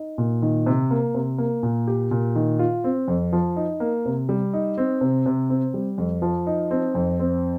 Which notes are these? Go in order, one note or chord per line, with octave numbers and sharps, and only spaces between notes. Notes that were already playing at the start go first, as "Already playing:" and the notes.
Already playing: D#4
A#2
D#3
C3
A#3
C3
A#3
A#2
G4
A#2
D#3
F4
C4
F2
F3
D#4
A#3
C3
G3
D#4
C4
C3
C3
C4
G3
F2
F3
D#4
C4
F2
C4